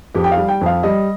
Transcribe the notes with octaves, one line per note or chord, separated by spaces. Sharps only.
F2 G4
G5
F5
G3
G5
F2 F5
G3 D#5